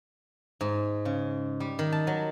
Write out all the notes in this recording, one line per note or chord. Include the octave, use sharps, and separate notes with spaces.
G#2
C#3
G3
D#3
A5
F#3